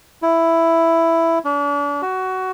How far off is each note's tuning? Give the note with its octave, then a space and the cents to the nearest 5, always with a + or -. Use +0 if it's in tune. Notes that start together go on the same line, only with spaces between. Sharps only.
E4 +5
D4 -40
F#4 +20